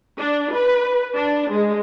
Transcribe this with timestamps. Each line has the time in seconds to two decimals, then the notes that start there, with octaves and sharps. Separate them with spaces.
0.18 D4
0.53 B4
1.16 D4
1.51 G#3